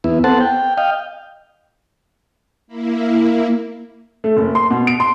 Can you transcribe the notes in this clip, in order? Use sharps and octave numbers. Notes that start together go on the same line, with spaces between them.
E2 B3 E4
B3 C4 A4 C5 F#5 A5
G5
D#5 F5 G5
A#3 E4
A3
F#1
C6
B2
D7
C6